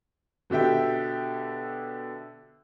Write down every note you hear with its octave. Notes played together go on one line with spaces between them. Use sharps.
B2 D3 G4 E5 G5